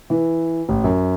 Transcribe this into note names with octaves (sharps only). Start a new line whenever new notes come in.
E3
A1
F#2